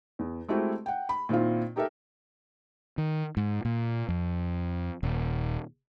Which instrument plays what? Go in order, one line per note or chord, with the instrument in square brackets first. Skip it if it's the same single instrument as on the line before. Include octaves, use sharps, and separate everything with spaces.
[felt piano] E2
G#3 A3 C4 E4 F#4 G4
F#5 G5
B5
A#2 D#3 C4 E4 F4
D#4 G4 A4 A#4 E5
[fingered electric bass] D#3
G#2
A#2
F2
D#1